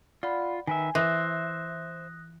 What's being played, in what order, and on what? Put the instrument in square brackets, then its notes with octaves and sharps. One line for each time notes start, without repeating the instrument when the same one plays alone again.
[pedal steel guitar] F4 [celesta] D5 F#5 B5
[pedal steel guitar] D#3 B4 E5 [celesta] G#5
[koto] E3 [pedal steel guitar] C5 E5 [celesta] D#6 F#6 A#6